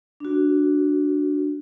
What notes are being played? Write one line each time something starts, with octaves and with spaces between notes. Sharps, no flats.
D4 F#4